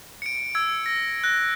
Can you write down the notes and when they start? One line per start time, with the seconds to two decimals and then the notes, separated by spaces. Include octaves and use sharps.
0.22 C#7 D7
0.55 E6 G#6
0.86 A#6
1.24 F#6 A#6